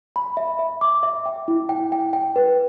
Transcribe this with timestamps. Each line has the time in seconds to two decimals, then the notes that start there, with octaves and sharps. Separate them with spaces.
0.16 B5
0.37 E5
0.59 E5
0.81 D6
1.03 E5
1.26 G5
1.48 E4
1.69 G5
1.92 G5
2.13 G5
2.36 B4